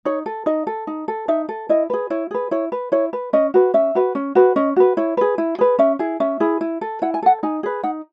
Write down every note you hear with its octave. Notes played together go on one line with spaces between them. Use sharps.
D#4 C#5
A4
D#4 D#5
A4
D#4
A4
D#4 E5
A4
E4 D#5
G#4 B4
E4 C#5
G#4 B4
E4 C#5
B4
E4 C#5
B4
C#4 D#5
F#4 B4
C#4 E5
F#4 B4
C#4
F#4 B4
C#4 D#5
F#4 B4
E4 C#5
G#4 B4
E4
G#4 B4
C#4 E5
E4 G#4
C#4 E5
E4 G#4
E4
A4
E4 F#5
G#5
A4 F#5
D#4 G#5
G#4 B4
D#4 F#5